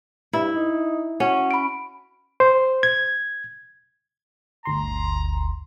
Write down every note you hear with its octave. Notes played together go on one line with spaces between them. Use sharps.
G2 E4
D#4
C#4 F#4
B5 D7
C5
G#6
G1 D2 A#5 C6